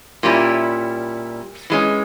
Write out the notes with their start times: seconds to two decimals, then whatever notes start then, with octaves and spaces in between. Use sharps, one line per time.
0.23 A#2 G3 C#4 E4
1.70 E3 G#3 C#4